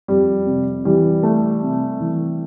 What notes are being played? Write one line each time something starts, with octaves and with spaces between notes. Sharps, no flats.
F2 G3
C3
E3 G3
A3
C3
E3